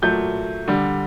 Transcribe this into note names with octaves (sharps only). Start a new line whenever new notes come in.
A#2 F#3 A3 G6
D3 G3